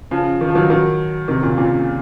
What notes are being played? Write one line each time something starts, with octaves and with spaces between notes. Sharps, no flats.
C#3 F3
D#3
F3
D#3 F#3
D#3 F#3
C3 D#3
A#2 C#3
A#2 C#3